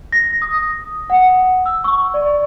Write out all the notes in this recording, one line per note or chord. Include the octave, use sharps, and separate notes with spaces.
A#6
D#6
F#5
E6
C#6
D5